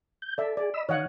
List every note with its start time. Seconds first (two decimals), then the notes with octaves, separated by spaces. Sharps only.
0.22 G6
0.38 A4 D5 E5
0.57 G#4 D5
0.74 D#5 B5 E6
0.89 D#3 C#5 D#5 F5 F#5